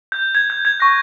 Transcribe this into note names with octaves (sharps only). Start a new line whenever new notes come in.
G6
G#6
G6
G#6
C#6 F#6 A#6